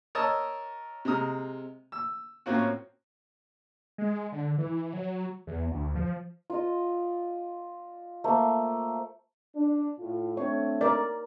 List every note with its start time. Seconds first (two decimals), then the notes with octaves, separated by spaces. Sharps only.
0.15 A#4 C#5 D#5 A5 D#6 E6
1.05 C3 G#3 A#5 D#6 F6
1.92 E6
2.46 A2 A#3 C4 C#4 F4 F#4
3.98 G#3
4.32 D3
4.58 E3
4.93 F#3
5.47 E2
5.71 D2
5.96 F3
6.50 F4 D5 D#5
8.24 A3 A#3 C5
9.55 D4
9.99 A2 F4
10.37 A3 C4 D4 C#5
10.81 A#4 D5